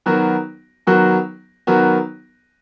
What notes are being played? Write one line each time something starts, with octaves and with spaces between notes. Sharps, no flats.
D#3 F#3 B3 F#4 A#4
D#3 F#3 B3 F#4 A#4
D#3 F#3 B3 F#4 A#4